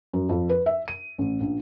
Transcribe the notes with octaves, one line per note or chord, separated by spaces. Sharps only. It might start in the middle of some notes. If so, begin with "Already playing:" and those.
F#2
F2
B4
E5
D#7
A1
A#1